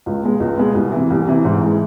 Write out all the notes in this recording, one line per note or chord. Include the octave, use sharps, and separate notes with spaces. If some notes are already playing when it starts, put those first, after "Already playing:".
C#2
B2 G#3 B3
C#2
B2 G#3 B3
C2
C3 E3
C2
C3 E3
G#2
E3 G#3